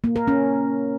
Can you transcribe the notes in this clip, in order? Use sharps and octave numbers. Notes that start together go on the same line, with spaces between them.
A#3
A#4
C#4